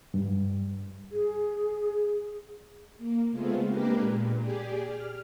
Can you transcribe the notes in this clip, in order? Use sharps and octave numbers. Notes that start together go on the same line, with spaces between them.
G2
G#4
A#3
C#3 G#3 A3 B3 C4 F4
G#3 A#3 D4 G4 A#4 B4
A#2
G4 G#4 D5
F6